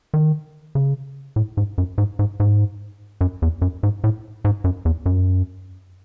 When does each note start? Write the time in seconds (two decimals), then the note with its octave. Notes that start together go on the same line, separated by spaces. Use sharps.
0.14 D#3
0.75 C#3
1.36 A2
1.57 G#2
1.78 F#2
1.98 G#2
2.19 G#2
2.40 G#2
3.21 F#2
3.42 E2
3.62 F#2
3.83 G#2
4.04 A2
4.45 G#2
4.64 F#2
4.85 E2
5.06 F#2